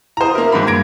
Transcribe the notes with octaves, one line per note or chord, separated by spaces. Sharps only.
E4 C5 A#5 D#6
A#3 F#4 A#4 E5
G#2 D#3 B5 D6
G2 A#3 G#6 A#6 D7